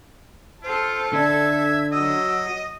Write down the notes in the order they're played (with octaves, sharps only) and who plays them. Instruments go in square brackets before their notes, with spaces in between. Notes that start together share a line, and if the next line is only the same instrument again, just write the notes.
[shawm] F4 [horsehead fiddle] A4 A5 [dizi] C5
[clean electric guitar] D3 D4 [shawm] E5 [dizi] G#6
[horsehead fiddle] F#3 F#4 [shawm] D#5 [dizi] E6